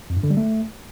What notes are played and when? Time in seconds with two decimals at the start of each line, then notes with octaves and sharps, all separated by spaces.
0.10 F2
0.17 G2
0.24 D3
0.30 G3
0.37 A3